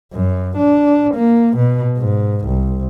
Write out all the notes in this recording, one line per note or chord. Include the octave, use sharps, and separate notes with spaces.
F#2
D4
A#3
B2
G#2
C2